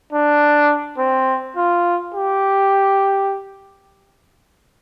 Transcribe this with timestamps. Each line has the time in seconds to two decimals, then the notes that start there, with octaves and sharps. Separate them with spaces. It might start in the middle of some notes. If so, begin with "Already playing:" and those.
0.13 D4
0.98 C4
1.56 F4
2.14 G4